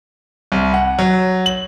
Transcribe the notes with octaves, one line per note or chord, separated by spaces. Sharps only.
C2
F#5
F#3
F#7